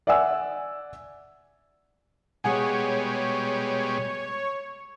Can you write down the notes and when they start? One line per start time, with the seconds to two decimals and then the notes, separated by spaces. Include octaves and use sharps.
0.07 D5 E5 F#5 G#5 E6
2.44 B2 G3 G#3 G#4 C#5 F#5 G#5